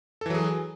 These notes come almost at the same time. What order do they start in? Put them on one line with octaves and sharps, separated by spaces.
A4 E3 F#3 G#4